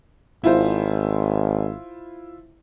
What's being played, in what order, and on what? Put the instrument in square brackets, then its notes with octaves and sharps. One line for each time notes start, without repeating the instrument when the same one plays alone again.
[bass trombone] G#1 [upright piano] E4 F4 C5